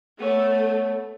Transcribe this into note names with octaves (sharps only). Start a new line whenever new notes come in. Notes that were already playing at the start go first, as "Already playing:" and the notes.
A3 B3 C#5